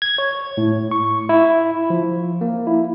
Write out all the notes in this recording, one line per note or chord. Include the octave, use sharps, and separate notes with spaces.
G#6
C#5
A2
C#6
E4
F3
A#3
E4